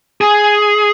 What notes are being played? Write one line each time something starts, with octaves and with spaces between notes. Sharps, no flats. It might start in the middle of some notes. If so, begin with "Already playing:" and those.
G#4